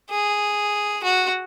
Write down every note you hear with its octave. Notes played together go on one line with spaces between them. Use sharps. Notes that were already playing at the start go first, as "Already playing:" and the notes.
G#4
F#4